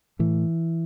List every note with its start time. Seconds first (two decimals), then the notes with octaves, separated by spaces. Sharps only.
0.19 A2 E3